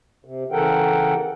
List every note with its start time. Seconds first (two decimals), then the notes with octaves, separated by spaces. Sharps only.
0.25 C3
0.52 C#3 E3 A4 A#4 F#5 G5